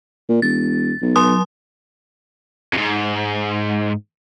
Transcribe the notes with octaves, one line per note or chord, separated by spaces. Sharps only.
A#2
E1 A6
B1
F#3 C6 D#6
F2 G#2